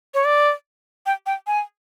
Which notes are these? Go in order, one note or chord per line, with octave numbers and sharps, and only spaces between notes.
C#5
D5
G5
G5
G#5